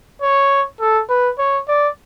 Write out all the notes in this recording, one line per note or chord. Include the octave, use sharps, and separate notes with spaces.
C#5
A4
B4
C#5
D5